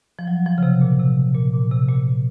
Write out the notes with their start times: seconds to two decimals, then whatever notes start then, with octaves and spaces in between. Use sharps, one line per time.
0.19 F3
0.27 F#3
0.46 F3
0.58 C#3
0.63 C3
0.81 A#2
0.99 C3
1.35 A#2
1.54 A#2
1.72 C3
1.89 A#2